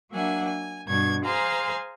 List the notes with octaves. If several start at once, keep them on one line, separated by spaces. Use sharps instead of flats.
F#3 A#3 D4 E5 F#5 G#5
G#5
G2 B2 D4 C#6 G#6
G#4 C5 F5 G#5 A#5 C6